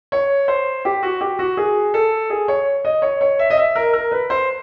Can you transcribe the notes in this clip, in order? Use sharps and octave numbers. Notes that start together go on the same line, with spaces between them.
C#5
C5
G4
F#4
G4
F#4
G#4
A4
G#4
C#5
D#5
C#5
C#5
E5
D#5
E5
A#4
A#4
B4
C5